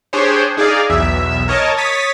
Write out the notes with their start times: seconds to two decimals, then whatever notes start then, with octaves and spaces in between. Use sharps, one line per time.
0.13 D4 G4 G#4 C5 C#5
0.57 D#4 G#4 D5 F5
0.90 B1 E2 E5
1.48 A#4 C#5 D#5 A5
1.77 C#5 D#6 A6 B6